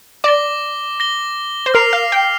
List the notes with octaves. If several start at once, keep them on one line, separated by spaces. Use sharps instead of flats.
D5 D6 A#6 G7
A#6 G7
C5
A#4 F6 C7 F7
F5
G5